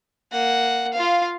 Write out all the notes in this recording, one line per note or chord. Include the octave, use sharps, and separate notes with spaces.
A#3 F#5
F4 F5